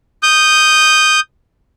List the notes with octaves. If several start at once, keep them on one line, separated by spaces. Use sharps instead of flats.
D#6 G6